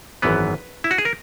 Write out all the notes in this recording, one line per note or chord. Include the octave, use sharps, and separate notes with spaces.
G#1 F#2 E3 B3 B4
E4
F#4
G#4
A#4